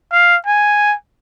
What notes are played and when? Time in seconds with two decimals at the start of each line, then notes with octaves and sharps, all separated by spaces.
0.12 F5
0.47 G#5